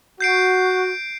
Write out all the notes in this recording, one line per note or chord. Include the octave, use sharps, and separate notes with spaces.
F#4 G6 C7 D7